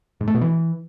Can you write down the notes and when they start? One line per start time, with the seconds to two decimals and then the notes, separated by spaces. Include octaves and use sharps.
0.21 G#2
0.27 A3
0.34 B2
0.41 E3